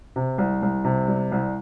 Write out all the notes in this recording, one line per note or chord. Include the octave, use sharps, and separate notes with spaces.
C3
C2
C2
C3
G3
C2